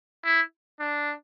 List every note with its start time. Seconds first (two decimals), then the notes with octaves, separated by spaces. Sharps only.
0.24 E4
0.80 D4